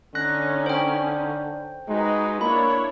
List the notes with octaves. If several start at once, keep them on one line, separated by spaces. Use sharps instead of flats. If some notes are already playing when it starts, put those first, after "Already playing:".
D3 C#4 D#4 F#6 A#6
C5 G5
G#3 D#4 F#4 B4
A#3 D4 E4 C#5 B5